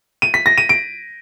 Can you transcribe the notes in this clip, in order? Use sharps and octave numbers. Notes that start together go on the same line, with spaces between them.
D#7
B6
A#6
D#7
D7